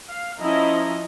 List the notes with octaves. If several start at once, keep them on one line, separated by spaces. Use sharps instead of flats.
F5
F3 C#4 E4 D#5 A#5